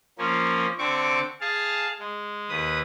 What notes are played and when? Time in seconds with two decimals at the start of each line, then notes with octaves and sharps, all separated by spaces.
0.18 F3 A#3 C#4
0.79 D3 C4 C#6 D6
1.41 G#4 F5 A5
1.99 G#3
2.49 D#2 B4 D#6